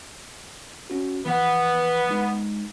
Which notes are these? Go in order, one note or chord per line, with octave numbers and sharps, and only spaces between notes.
C#4 F#4
E3 F3 B3
G#3 D#4